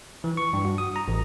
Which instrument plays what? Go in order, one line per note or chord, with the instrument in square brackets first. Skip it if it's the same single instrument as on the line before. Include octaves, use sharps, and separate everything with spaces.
[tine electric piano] E3
C#6
G2
F#4
D#6
A#5
A1